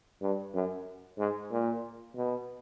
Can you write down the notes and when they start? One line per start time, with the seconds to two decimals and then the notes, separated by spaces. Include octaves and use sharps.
0.21 G2
0.54 F#2
1.19 G#2
1.51 A#2
2.16 B2